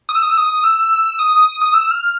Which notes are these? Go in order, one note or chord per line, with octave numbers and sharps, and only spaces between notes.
D#6
E6
D#6
E6
D#6
E6
D#6
D#6
E6
F6